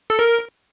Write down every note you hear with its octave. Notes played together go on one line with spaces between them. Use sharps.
A4
A#4